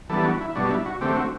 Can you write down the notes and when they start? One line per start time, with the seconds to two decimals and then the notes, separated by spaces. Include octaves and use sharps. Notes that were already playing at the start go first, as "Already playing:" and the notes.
0.09 E3 G3 B3 D4 A4
0.25 F#4
0.41 E4
0.55 B2 G3 D4 F#4
0.71 E4
0.86 F#4
1.01 D3 A3 C4 G4
1.17 F#4